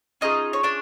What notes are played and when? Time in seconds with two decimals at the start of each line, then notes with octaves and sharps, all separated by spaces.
0.21 C#4 D#4 F4 G#4 D#5
0.53 C#5
0.63 D4 D5